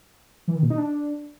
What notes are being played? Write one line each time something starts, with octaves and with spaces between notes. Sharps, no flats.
E3
D#3
A#2
D#4
D4